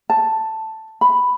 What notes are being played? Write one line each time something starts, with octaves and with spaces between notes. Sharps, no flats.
A5
B5